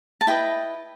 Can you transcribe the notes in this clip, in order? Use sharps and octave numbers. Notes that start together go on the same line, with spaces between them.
A5
E4 B4 D#5 G5